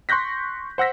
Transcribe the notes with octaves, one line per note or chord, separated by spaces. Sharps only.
C6 C#6 F#6 G6 A#6 B6
C5 F#5 E6 A#6 B6